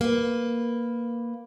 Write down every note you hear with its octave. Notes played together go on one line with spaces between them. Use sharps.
A#3 B4